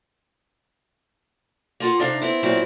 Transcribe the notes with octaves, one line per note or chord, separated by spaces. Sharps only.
A#3 F4 F#5
C3 D4 D#4 F5
B3 C4 E4
A#2 F#3 B3 C4 E4